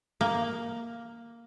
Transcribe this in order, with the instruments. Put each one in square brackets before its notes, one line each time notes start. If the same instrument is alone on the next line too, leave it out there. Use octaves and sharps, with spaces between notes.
[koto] A#3